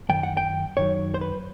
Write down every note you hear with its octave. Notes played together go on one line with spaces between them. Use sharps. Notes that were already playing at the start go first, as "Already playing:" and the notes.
F#2 D#3 G5
F#5
G5
F#2 D#3 F#3 C#5
C5
B4